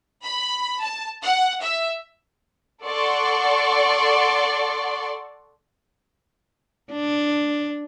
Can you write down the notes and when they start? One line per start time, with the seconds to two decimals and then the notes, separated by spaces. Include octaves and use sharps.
0.23 B5
0.82 A5
1.22 F#5
1.61 E5
2.84 A4 D5 F#5 C6 C#6
6.92 D4